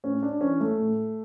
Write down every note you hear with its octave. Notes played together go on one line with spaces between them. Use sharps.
A2 C#4
D4
E3 C#4
A3
A2